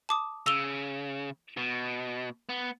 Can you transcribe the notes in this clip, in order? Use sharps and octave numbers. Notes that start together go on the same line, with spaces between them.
A5 D6 D#6
C#3 E6 F7 G7
B2
B3